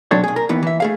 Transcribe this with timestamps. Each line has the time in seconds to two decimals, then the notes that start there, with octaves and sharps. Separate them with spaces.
0.11 B1 F#3 C4 D4 A4 C#5
0.24 B1 G#4
0.36 A#4
0.49 D#2 D#3 E3 B3
0.63 E3 E5
0.80 A3 G#4 F5